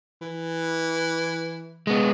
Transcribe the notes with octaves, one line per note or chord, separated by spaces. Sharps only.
E3
G#3 B3